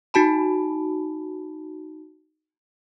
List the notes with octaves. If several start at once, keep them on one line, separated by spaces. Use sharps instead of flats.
D#4 F#4 A5 B5